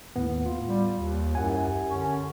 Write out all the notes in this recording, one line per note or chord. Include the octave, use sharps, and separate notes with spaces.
D#2 A2 B3
F4
G3
D#2
C2 F#2 G4 F#5 G#5
F#2 D3 C#4